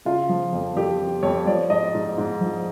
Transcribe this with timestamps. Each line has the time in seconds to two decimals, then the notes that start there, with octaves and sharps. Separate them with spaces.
0.05 C#3 F4
0.29 F3
0.53 F2
0.76 F2 G4
0.99 F2
1.23 F2 C#5
1.47 F3 D5
1.70 G#2 D#5
1.95 G#2
2.18 G#2
2.41 F3